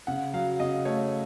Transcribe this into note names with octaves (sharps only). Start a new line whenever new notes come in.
C#3 F#5
F#3 F5
C#3 D#5
A3 C#5